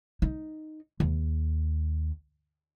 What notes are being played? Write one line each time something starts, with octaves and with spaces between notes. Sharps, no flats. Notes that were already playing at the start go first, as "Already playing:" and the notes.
D#4
D#2